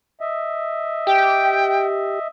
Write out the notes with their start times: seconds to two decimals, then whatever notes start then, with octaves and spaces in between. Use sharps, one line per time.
0.21 D#5 E5
1.07 G4 G5